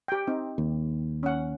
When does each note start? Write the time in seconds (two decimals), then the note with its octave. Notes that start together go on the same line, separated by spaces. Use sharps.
0.08 G4 G5
0.27 C4 D#4
0.58 D#2
1.23 C#4 F#5